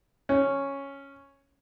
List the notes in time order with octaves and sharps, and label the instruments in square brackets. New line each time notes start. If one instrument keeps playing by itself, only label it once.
[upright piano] C#4